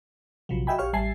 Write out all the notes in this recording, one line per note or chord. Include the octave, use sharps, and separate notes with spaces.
A#1 C3 F3 F#3
F#4 D#5 E5 G5 G#5 B5
A#1 G4 C#5 F5 C#6 F6
A1 G3 E5 G#5 A5 C7